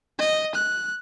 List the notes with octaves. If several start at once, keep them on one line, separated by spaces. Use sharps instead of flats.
D#5
F#6